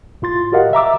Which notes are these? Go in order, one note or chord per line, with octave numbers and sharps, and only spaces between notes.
A2 F4 C6 A6
F#4 G4 A#4 D#5 F5 F#5
E5 A#5 D6 E6